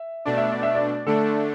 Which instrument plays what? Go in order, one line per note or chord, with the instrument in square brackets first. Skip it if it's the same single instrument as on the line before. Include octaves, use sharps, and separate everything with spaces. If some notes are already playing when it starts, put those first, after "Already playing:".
Already playing: [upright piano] E5
[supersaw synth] B2 A3 D4 [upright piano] D5
[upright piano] E5
D5
E5
D5
[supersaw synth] D3 A3 D4 [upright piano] A4